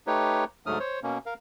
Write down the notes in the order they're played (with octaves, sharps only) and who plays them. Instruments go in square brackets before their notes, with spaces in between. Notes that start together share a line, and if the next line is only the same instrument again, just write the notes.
[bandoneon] A3 D#4 G4 B4 C#5
D2 G#2 F#3 A3 D#6 F6
C5 C#5
B2 A#3 C#4
A#4 F5